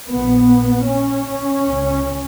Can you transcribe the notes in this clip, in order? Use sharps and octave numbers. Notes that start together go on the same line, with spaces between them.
A#1 A#2 B3
C#4
C#2 C#3